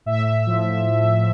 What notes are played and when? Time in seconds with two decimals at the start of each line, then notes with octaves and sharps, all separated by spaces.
0.06 A2 E5
0.46 F3